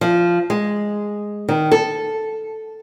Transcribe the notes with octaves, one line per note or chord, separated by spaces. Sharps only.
F3
G#3
D#3
A4